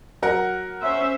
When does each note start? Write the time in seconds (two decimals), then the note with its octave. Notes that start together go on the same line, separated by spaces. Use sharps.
0.22 F#3 A#4 F#5
0.80 C#4 C5 E5